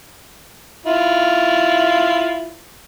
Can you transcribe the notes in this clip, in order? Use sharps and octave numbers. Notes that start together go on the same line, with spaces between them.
E4 F4